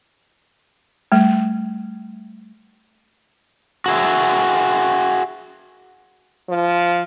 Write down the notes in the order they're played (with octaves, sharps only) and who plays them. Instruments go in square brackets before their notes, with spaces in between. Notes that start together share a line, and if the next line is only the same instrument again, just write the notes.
[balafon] G3 A3
[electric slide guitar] F#4 G#4 E5
[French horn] F3